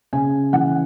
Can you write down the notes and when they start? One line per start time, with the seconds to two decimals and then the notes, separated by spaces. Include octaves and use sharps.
0.13 C#3 G#5
0.53 E3 F#5